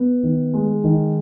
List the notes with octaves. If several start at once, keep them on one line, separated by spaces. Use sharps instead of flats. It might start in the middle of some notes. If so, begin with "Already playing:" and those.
Already playing: B3
D#3
G#3
D#3